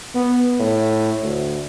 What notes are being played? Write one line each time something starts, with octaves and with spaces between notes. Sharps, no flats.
B3
A2
D2